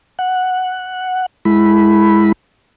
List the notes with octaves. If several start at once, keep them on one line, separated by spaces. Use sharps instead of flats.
F#5
G#3 E4 B5